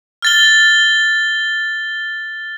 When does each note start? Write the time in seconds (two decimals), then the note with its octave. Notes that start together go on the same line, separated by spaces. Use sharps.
0.22 F6 A6 G7